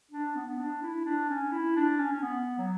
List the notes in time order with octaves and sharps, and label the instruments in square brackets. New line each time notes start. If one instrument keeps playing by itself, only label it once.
[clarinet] D4
B3
D4
E4
D4
C#4
E4
D4
C#4
C#4
B3
F#3